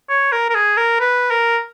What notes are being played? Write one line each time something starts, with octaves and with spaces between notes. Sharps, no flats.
C#5
A#4
A#4
G#4
A#4
B4
A#4